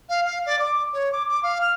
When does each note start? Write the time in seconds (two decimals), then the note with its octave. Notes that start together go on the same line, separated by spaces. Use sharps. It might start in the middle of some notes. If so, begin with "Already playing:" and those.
0.09 F5
0.25 F5
0.46 D5
0.59 D6
0.93 C#5
1.12 D6
1.29 D6
1.43 F5
1.61 F6